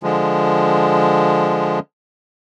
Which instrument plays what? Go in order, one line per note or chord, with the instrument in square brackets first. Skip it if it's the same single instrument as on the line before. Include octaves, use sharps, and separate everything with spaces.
[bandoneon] D3 F3 G#3